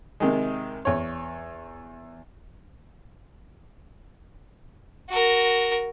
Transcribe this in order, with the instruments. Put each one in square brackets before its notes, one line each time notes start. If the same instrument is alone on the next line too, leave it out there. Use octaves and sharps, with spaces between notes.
[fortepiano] C3 D#3 G#3
E2 C#5
[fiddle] F#4 A#4